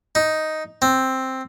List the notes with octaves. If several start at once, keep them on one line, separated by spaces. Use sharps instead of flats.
D#4
C4